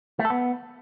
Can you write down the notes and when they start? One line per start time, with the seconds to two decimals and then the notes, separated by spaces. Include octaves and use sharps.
0.19 A3
0.25 A4
0.30 B3